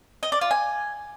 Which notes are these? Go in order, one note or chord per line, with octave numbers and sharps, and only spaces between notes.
D#5
D5
F4
G#5